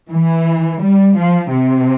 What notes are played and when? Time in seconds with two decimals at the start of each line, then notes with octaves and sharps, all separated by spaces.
0.11 E3
0.81 G3
1.17 F3
1.52 C3